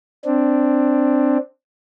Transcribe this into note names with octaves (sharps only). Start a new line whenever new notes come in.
C4 D4